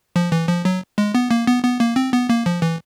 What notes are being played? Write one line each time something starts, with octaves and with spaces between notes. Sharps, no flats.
F3
E3
F3
F#3
G#3
B3
A#3
B3
B3
A#3
C4
B3
A#3
F3
E3